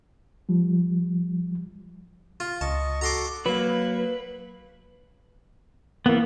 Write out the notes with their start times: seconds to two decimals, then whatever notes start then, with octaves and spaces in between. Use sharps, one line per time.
0.49 F3 G3
2.40 F4
2.61 C#2 D#5 A5 C#6
3.01 F#4 A4 A#5 C6 D6
3.46 F#3 A#3 B4
6.06 E3 A#3 B3